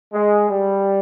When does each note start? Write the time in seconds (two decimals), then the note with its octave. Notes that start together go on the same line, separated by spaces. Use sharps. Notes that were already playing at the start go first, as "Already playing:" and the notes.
0.12 G#3
0.50 G3